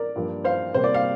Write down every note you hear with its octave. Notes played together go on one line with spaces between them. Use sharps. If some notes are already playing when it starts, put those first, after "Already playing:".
Already playing: A#4 D5
G2 F3 A#3
C5 F5
C3 G3 A#3 C5
D5
F5